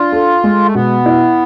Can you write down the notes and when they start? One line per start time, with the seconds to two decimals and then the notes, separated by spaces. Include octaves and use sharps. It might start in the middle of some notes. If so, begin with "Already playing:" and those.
Already playing: D4 F4
0.12 A4
0.44 G#3
0.66 A3
0.75 B2 B3
1.06 E4